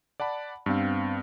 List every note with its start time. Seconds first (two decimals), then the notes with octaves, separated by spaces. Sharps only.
0.20 D5 F#5 A5 B5
0.66 G2 B3 C4 F5